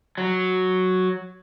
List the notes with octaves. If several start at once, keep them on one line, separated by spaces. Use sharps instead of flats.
F#3